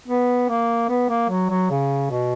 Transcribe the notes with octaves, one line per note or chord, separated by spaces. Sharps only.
B3
A#3
B3
A#3
F#3
F#3
C#3
B2